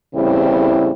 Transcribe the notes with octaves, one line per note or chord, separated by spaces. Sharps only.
E2 A2 C#3 G3 C4 E4